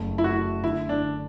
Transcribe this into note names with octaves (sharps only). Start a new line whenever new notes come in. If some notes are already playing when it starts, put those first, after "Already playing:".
Already playing: F#1 A3
E4
A3 F#4
D3 E4
D4
D3